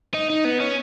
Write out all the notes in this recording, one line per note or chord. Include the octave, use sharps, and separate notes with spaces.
D#4
D#4
B3
C#4